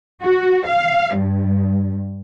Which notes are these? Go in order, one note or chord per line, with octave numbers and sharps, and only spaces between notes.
F#4
F5
G2